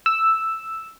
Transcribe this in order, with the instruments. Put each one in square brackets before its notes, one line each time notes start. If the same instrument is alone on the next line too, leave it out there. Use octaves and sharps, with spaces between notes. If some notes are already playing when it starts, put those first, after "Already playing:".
[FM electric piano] E6